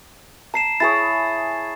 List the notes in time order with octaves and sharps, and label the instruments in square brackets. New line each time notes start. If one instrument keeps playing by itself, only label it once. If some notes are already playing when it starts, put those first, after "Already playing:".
[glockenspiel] A5 C7 E7 [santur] A#5
[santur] E4 G#4 C#5 [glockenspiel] A6